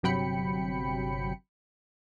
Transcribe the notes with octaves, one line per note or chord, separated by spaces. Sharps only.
G1 C3 F#3 G5 B5 C#7